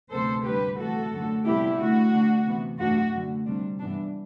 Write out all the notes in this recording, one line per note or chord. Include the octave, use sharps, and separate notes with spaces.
D2 C3 F#3 B3 A4 C5
D2 D3 G3 D4 G4 B4
C3 E3 A3 F#4 A4
F#2 D3 A3
C3 G3 B3 D4 E4 G4
D2 D3 A3 E4 F#4
D3 A3 D4
C3 E3 B3
F#2 E3 A3 D4 F#4
F#2 D3 A3
C3 G3 D4
G2 E3 B3 D4